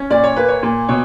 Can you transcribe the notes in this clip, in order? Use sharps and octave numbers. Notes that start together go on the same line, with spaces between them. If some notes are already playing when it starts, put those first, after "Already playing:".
Already playing: C#4
A#2 D5
C#5
A#3 B4
C#5
A#2
B2 C#5